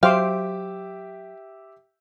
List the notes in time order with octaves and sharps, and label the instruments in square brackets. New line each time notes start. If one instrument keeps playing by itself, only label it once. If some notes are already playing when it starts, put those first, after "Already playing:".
[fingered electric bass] F#3 [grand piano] G4 E5 D6 [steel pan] C5 G5 [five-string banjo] F5